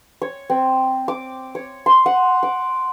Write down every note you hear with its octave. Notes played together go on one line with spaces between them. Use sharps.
C#5
C4
D6
C#5
C6
F#5
D6